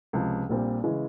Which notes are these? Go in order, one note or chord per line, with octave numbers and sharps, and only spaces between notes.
C#2 C3 F3
A#1 A#2 G3 C4
C#3 E3 G#3